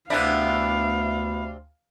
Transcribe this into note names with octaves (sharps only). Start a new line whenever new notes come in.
D2 C3 B3 D4 E4 F5